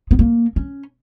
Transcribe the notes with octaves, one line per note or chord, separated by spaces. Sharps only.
B3
A#3
C#4